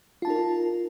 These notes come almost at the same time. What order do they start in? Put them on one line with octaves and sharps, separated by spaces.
F4 A5 D#4 A#4